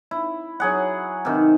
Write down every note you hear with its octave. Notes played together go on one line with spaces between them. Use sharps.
E4
F#3 G#4 F#5
C3 D#3